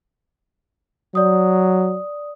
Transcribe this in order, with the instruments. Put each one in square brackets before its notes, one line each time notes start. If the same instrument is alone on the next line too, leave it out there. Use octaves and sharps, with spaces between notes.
[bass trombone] F#3 [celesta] D5 D#6